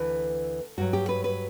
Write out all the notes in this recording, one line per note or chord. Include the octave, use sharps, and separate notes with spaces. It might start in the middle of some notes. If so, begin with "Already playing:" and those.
Already playing: D2 E3 B4
G2 F#3 F#4
G4
B4
B4